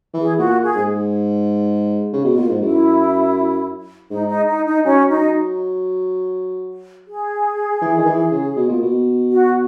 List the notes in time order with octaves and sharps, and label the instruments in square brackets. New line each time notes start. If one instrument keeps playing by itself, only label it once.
[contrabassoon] E3
[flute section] G#4
[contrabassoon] A#2 [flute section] F#4
[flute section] G#4
[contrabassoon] G#2
C#3
B2
A#2
G#2
[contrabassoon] F#2 [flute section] E4
[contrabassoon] G#2 [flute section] D#4
[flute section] D#4
D#4
D#4
[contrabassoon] F#3 [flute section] C#4
[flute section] D#4
G#4
[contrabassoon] E3
D#3
E3
C#3
B2
A#2
B2
[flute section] F#4